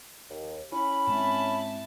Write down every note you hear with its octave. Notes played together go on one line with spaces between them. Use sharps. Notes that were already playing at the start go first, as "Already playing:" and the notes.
D#2
C#4 E4 B5
G#2 G#3 C4 E4 A5